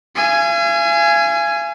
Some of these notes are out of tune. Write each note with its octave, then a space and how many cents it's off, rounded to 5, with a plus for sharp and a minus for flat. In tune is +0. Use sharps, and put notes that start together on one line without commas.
F5 -45 G#5 +0